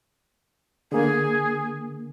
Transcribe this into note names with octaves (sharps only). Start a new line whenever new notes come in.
D3 A#3 G#4